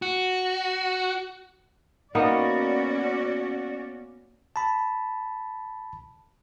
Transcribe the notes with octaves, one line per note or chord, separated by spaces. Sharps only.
F#4
A#3 B3 C#4 D#4 F#4 D5
A5 B5